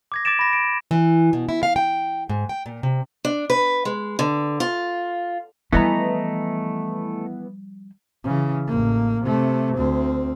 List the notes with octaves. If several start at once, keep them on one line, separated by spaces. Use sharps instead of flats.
D6 G#6 A#6
D6 G#6 A6 D7 E7
B5 A#6
D7
E3
B2
E4
F5
G5
G#2
G5
A#2
C3
D4
B4
G#3
D3
F4
E3 F3 G3 A3 B3 D#5 A#5
C#3 E3
A1 A#3
C3 A3
D2 C4